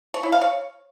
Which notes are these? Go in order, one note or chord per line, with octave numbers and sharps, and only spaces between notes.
C#5
E4
F5
C#5